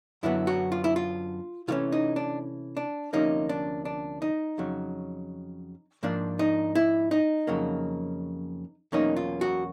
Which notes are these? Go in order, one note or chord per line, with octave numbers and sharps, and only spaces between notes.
F#2 D3 F#3 B3 E4
F#4
F4
E4
F4
C3 E3 A3 C#4 F4
D#4
D4
D4
D2 C3 F3 A#3 C#4 D#4
D4
D4
D#4
F2 C#3 F#3
G#2 F3 A#3 D4
D#4
E4
D#4
F2 C#3 F#3 A#3
E2 B2 F#3 A#3 C#4 D#4
F4
F#4